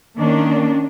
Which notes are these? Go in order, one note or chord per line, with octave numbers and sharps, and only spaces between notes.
D#3 A#3 C#4 D4